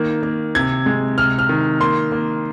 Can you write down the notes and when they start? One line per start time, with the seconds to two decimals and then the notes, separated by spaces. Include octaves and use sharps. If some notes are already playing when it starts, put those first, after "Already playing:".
Already playing: D#3 A#3
0.23 A#3
0.55 C3 G#6
0.86 G#3
1.18 C3 F6
1.39 F6
1.49 D#3
1.80 A#3 C6
2.12 A#3